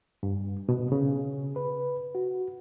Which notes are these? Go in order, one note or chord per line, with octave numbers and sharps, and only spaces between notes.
G2
B2
C#3
B4
F#4